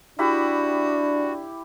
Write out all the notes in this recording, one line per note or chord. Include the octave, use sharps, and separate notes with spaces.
D4 E4 F#4 G4 B5